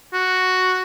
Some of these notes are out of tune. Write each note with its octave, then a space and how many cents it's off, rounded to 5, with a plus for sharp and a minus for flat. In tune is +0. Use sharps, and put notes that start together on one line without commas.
F#4 +0